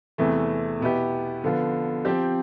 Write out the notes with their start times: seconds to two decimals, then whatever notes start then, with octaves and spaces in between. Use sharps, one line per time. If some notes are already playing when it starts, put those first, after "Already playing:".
0.18 E2 C3 E3 A3
0.80 B2 B3 E4 G4
1.44 D3 F3 B3 F4
2.05 F3 C4 G4